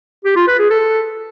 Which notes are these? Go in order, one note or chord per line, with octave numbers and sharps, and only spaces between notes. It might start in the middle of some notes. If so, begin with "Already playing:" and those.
G4
F4
B4
G#4
A4